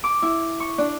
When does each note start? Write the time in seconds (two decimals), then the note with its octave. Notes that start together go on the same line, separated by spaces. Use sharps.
0.04 D6
0.22 E4
0.60 C#6
0.78 D4